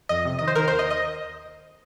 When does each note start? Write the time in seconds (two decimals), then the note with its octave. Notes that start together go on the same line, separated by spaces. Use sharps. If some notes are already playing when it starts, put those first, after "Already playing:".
0.09 F2 D#5
0.25 C3
0.39 D#3 D#5
0.48 C5
0.56 D#3 A#4
0.68 C5
0.71 D#2
0.79 D#5
0.90 D#5